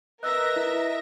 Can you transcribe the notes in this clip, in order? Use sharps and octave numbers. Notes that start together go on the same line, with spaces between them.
A#4 B4 D#5 E5 E6 F#6 A#6
E4